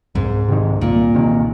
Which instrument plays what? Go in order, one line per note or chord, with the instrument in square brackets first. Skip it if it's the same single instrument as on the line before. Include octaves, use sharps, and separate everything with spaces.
[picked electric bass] C2 [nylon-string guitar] G#2
[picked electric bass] C3 D#3
[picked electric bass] C2 [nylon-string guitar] A#2
[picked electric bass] C3 D#3